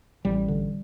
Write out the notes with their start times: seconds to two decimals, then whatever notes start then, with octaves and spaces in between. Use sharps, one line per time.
0.25 A1 G3
0.48 D3